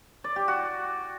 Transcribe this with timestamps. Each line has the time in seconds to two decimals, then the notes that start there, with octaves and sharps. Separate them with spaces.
0.24 D5
0.36 G4
0.48 F#4